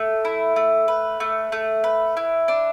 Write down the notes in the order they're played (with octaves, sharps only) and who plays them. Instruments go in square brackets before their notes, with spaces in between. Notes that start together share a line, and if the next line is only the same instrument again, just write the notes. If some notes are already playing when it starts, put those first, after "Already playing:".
Already playing: [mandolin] A3
E4
A3
B4
A3
A3
B4
E4
D4